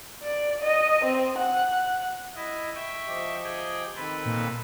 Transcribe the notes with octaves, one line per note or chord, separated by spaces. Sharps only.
D5
D#5
C4
F#5
E4 D#5
E5 G5 C#6
F3 G4 D#5
G#4 G5
D#3 C4 A4 B4
A#2